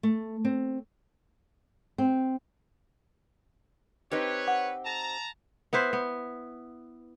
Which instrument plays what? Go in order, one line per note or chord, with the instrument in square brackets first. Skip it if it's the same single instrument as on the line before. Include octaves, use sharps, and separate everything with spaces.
[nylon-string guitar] A3
C4
C4
[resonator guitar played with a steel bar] C4 D#4 G4 [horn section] B4 C#5
[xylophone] F#5
[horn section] A5 A#5
[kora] B3 E4 B4 C5
B3